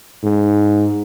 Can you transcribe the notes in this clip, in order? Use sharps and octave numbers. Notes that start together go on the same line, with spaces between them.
G#2